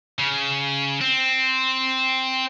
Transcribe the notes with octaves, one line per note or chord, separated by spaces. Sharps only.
C#3
C4